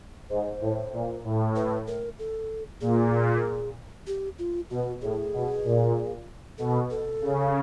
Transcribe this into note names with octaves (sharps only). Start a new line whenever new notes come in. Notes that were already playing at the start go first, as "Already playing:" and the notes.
G#2 C5
A2
A#2
A2
B4
A#4
A4
A#2 G#4
G4
F4
B2 F#4
A2 G#4
B2
A#2
B2 A4
A4
C#3